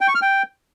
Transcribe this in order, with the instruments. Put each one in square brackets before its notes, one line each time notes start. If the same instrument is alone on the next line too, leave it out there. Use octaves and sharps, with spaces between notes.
[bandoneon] G5
C#6
F6
G5